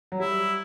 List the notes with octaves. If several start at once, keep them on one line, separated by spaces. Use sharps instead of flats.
F#3
G3 E4